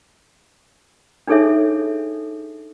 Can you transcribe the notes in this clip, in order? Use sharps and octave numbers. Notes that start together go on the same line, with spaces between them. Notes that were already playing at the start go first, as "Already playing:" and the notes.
D4 D#4 G#4 A4 C#5 E5